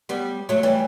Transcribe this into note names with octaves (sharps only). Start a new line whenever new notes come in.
G3 B3
F#3 A3
E3 G3